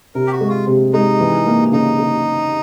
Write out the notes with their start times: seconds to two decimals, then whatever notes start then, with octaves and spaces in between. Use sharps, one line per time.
0.15 C3 A#4
0.27 G4
0.32 F#4
0.41 G#3
0.49 F4
0.67 C3
0.93 G#3 D#4
1.20 E3
1.47 A#3
1.72 C#3 D#4
1.99 C#3